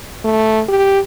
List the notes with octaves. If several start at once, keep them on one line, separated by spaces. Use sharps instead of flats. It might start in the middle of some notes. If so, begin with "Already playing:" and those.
A3
G4